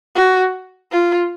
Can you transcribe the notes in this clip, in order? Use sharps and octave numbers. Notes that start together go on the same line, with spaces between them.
F#4
F4